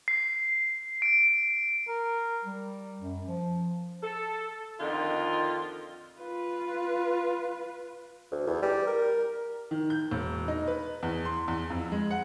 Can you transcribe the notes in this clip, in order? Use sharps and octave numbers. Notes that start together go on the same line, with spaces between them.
C7
D7
A#4
G3
F#2
F3
A4
F2 D3 D#3 F4
F4 B4
D2
E2
G3
A#4
D#3
G6
E1
D#4
B4
E2
C6
E2
F2
G#3
F#5